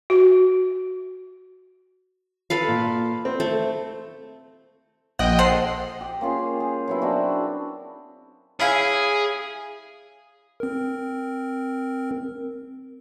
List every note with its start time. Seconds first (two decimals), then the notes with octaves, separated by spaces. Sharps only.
0.10 F#4
2.50 A4 B4 F5
2.68 A#2
3.25 C4
3.40 A3
5.19 A#1 D#5 F#5 G5
5.39 A4 C5 F#5 C7
6.01 G4
6.21 A#3 C#4 F4 G#4
6.60 G4 G#4
6.88 F#3 B3 E4
7.02 C4 D4 F#4
8.60 C#4 E4 G#4 F5
10.60 C4 A#4